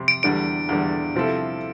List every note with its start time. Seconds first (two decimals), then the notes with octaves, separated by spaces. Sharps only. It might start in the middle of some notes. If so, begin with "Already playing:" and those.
Already playing: F2 C3
0.08 D7
0.23 E2 D3 G3 D7
0.69 E2 D3 G3
1.15 C3 F3 C4 E4 A4